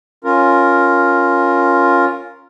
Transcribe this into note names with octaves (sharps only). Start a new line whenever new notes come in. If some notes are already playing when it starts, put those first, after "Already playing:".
C#4 F4 A#4